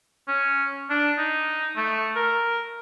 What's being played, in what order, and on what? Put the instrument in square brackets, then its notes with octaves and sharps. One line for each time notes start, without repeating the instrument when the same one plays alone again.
[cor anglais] C#4
D4
D#4
A3
A#4